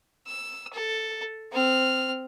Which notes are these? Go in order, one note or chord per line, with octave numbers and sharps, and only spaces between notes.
E6
A4
C4 F6